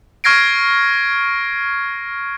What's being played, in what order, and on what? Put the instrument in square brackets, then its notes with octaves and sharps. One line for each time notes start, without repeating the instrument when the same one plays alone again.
[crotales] C#6 F6 G#6 A#6 C7 D7